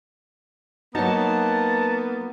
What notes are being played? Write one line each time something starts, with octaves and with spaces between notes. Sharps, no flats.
F#3 A#3 B3 D#4 F#4 C#5 A5